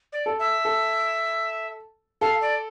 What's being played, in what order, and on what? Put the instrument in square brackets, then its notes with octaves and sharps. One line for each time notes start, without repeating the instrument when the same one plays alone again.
[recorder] D5
[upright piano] A4
[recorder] E5
[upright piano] A4
[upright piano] A4 [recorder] F5
[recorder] D5